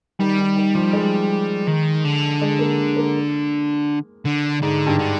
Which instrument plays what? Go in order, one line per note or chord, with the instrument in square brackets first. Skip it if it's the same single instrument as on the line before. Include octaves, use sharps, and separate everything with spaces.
[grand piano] D#3 [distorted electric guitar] G3
[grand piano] D#3
D#3
F3
G#3
[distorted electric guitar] D#3
D3
[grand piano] G#3
A#3
A#3
[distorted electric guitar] D3
[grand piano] G#2 [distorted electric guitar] D3
[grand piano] G2
[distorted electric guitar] D3